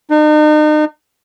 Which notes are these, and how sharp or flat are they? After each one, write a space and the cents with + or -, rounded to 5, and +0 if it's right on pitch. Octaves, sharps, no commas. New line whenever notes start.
D#4 -40